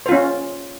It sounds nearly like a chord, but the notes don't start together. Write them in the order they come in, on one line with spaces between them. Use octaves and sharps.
C5 F4 C#4